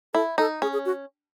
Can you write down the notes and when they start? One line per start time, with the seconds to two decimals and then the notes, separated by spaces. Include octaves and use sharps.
0.14 E4 A4
0.38 D#4 A4
0.62 C#4 G#4
0.73 G#4
0.85 F#4